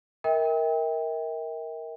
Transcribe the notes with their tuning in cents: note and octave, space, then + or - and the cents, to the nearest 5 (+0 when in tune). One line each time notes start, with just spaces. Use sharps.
A#4 +0 E5 -40 G5 +20